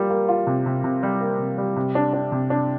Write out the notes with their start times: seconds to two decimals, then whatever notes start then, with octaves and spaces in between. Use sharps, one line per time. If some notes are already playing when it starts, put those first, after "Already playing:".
Already playing: G3 A#3 F4
0.10 A#3
0.28 F4
0.47 C3
0.66 C3
0.84 C3
1.03 G3
1.20 A#3
1.39 C3
1.58 G3
1.76 C3
1.95 D4
2.13 D4
2.32 C3
2.50 D4